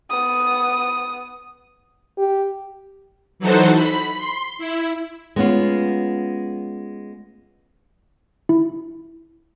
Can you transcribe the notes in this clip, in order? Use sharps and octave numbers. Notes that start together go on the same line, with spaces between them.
B3 D#6
G4
E3 F#3 D#4 F#4 A4 C5
B5
C6
E4
G#3 B3 C#4 F4
E4